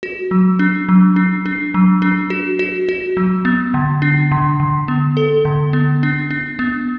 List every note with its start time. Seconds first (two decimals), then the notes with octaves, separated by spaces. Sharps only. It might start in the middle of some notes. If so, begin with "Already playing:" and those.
0.03 F#4
0.31 F#3
0.59 D4
0.89 F#3
1.16 D4
1.46 D4
1.74 F#3
2.02 D4
2.30 F#4
2.59 F#4
2.89 F#4
3.17 F#3
3.45 B3
3.74 D3
4.02 D4
4.32 D3
4.60 D3
4.88 B3
5.17 A4
5.45 D3
5.73 B3
6.03 D4
6.31 D4
6.59 B3